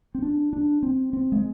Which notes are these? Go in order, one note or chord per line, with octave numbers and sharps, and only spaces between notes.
C4
D4
D4
C4
C4
G#3